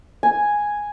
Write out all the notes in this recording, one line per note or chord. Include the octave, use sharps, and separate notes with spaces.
G#5